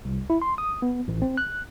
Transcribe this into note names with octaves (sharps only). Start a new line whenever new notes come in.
C2
E4
C6
D#6
B3
A1
C4
F#6